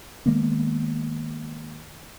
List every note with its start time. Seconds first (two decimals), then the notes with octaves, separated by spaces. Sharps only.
0.26 D#3 G#3 A#3 B3